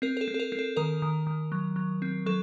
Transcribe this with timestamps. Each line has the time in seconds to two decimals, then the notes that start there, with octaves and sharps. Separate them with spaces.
0.02 C4 A#4
0.17 A#4
0.21 A4
0.28 C4
0.34 A4
0.40 A#4
0.52 C4
0.59 A4
0.77 D#3 A#4
1.02 D#3
1.27 D#3
1.52 F#3
1.76 F#3
2.02 C4
2.26 F#3 A4